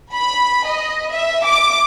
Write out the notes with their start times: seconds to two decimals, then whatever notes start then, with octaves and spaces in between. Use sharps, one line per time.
0.12 B5
0.65 D#5
1.11 E5
1.45 D6